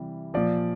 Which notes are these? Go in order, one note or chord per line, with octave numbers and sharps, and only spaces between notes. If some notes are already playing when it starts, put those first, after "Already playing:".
Already playing: C3 E3 G3
A#2 F3 D5